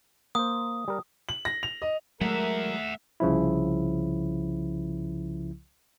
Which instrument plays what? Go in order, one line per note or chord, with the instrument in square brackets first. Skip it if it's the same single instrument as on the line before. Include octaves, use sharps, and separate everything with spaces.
[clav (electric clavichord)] A#3 C5 [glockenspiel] D#6
[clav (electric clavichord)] G3 A#4
[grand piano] F#7
A#6
F7
D#5
[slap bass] F#3 G#3 [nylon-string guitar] A3 [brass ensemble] A#4 [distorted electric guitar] E5 F#5
[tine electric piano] C2 C#3 F3 E4